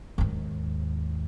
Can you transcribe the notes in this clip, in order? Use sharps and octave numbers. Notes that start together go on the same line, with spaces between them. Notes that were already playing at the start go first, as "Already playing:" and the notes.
D#2 G#2